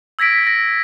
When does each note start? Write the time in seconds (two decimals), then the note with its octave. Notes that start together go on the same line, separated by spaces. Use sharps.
0.19 E6 G#6 A#6 B6 D7
0.47 A#6